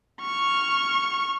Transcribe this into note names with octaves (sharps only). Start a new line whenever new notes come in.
C#6 F6